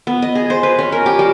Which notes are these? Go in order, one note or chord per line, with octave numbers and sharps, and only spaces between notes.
B3
D#5
G#4
C5
B4
C#4
A#4
G4
G3